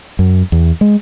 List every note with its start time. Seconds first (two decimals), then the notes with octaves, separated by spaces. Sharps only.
0.19 F#2
0.52 E2
0.81 G#3